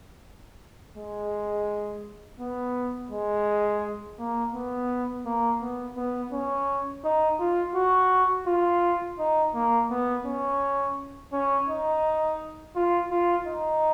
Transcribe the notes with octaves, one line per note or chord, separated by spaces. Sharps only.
G#3
B3
G#3
A#3
B3
A#3
B3
B3
C#4
D#4
F4
F#4
F4
D#4
A#3
B3
C#4
C#4
D#4
F4
F4
D#4